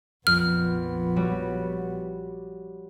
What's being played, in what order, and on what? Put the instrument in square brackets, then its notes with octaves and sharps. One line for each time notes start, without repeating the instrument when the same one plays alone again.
[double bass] A#1 B3 [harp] F2 [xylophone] F6
[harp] G3 F#4 C#5